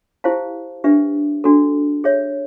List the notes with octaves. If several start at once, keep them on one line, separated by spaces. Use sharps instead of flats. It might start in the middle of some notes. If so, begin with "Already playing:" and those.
E4 G4 C5 F5 A5
D4 G4 B4 E5
D4 F#4 A4
G#4 C#5 E5